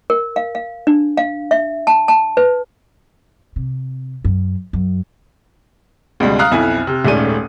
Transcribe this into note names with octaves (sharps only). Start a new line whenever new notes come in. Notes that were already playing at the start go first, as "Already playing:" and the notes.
A#4
F5
F5
D4
F5
E5
A5
A5
B4
C3
F#2
F#2
C#2 B2 G3 G#3
F5 A#5 D#6 F6 F#6
B1 F2 E4 G#5
C3
D#1 G#2 A3 C#4 D5 D#7